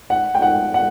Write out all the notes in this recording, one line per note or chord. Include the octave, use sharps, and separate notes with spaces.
F#5
G5
F#5
F#5